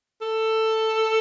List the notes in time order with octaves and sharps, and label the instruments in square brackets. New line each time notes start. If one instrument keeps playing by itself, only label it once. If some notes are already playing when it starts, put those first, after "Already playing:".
[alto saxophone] A4